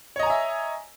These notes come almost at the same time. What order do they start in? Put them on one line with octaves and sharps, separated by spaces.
C#5 D#5 A#5 G#5 E5